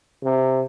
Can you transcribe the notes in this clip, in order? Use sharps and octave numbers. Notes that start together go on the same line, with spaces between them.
C3